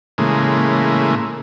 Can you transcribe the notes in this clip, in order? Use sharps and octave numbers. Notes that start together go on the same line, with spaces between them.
A2 C#3 E3 G#3 A#3